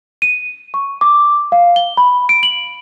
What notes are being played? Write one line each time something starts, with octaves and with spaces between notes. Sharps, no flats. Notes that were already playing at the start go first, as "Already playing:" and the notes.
D#7
C#6
D6
F5
G7
B5
D7
F#7